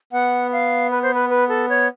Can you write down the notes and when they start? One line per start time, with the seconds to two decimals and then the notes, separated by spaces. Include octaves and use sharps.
0.12 B3 F#5
0.52 F5
0.91 B4
1.02 C5
1.14 B4
1.30 B4
1.49 A4
1.69 C#5